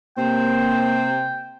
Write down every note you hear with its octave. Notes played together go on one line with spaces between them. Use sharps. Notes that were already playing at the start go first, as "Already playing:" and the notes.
C3 A#3 C5 G5